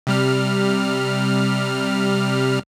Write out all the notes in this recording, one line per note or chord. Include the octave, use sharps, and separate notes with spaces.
C3 G3 F6